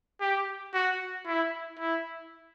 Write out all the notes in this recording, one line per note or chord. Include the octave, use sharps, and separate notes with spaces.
G4
F#4
E4
E4